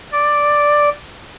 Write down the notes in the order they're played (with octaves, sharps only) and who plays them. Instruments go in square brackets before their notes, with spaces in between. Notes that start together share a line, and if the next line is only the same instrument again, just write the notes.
[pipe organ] D5